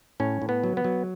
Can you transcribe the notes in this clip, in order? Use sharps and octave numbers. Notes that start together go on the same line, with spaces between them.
A2 C#4
A2
B3
F#3
B3
F#3